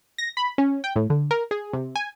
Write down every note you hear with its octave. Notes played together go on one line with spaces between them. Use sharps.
A#6
B5
C#4
G5
A2
D3
A#4
G#4
C3
G#5